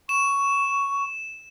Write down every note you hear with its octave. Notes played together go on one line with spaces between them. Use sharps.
C#6 E7